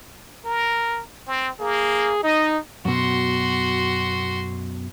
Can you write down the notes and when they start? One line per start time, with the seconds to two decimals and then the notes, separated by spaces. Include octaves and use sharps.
0.45 A#4
1.28 C4
1.60 A#3 G#4
2.23 D#4 D#5
2.85 F#2 B2 F#4 C6